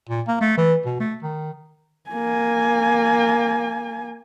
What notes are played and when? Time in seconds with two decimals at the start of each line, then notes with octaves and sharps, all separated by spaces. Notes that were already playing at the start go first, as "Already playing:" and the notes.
0.09 A#2
0.28 A#3
0.41 A3
0.58 E3
0.86 B2
1.00 A3
1.23 D#3
2.10 A#3 G#5